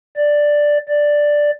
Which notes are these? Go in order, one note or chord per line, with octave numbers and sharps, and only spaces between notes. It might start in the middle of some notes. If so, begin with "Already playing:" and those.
D5
D5